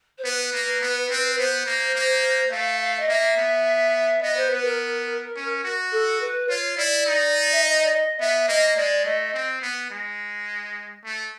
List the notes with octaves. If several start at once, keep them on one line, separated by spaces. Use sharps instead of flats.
C5
B3 B4
A#3
B3
C4
B3 C5
A#3
A#3
A3 F5
F5
D#5
A#3 E5
B3
B3 D#5
C5
B3 B4
A#4
C#4
F#4
A4
B4
F4 C#5
E4 D5
D#4
E5
D#5
D5
D#5
B3 E5
A#3 D#5
G#3 D5
A3 D#5
C4
B3
G#3
A3